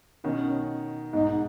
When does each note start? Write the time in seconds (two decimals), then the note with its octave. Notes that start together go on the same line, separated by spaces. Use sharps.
0.24 B2 D#3 C#4
1.13 G#2 B2 D#4